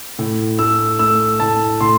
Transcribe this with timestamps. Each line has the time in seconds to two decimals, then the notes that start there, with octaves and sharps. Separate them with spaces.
0.19 A2
0.59 A3 E6
0.99 A3 E6
1.40 A2 A5
1.81 A2 C6